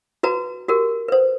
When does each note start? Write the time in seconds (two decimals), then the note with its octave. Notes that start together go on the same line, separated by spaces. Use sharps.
0.23 F#4 B4 A#5
0.68 F#4 G4 A#4
1.08 B4 C5